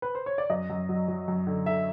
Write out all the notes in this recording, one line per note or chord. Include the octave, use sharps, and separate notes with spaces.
B4
C5
C#5
D5
F#2 D#5
F#2
F#3
F#3
F#2
D3
D3 E5